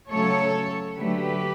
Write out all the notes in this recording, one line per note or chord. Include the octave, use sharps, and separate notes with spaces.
C#3 F#3 A3 A4 C#5
D3 F#3 A3 G4 B4